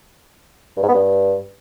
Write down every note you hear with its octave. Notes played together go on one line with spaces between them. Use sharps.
G2
G#2
B3
G2